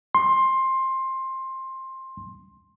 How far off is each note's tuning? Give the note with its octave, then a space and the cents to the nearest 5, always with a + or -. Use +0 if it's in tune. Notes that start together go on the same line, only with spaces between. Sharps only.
C6 +15